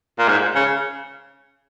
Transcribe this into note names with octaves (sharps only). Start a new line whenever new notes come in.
A#2
G#2
C#3